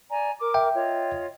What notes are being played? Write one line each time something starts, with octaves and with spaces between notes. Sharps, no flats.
D5 G#5 A#5
A#4 D6
E5 G5
F4 C#5 D#5